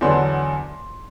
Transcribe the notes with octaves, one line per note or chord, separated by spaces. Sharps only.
E2 D3 F#3 B3 D4 C6